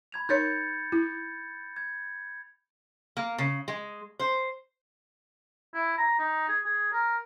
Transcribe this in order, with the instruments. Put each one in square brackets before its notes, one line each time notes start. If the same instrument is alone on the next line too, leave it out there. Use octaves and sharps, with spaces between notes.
[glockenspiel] B5 G#6 F7
[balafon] D#4 A#4 C#5 [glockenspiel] G6 A6 C#7
[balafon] E4
[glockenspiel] G#6
[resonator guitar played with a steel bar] A#3
C#3
G#3
C5
[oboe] E4
A#5
D#4
G#4
G#4
A#4